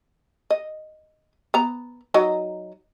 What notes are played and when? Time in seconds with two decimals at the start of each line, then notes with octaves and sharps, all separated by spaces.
0.50 D#5
1.54 B3 A#5
2.14 F#3 D#4 D#5